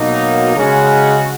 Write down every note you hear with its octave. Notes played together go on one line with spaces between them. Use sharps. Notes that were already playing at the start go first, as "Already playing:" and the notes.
Already playing: B2 F#3 A#3 D#4
C#3 G#3 C#4 F#4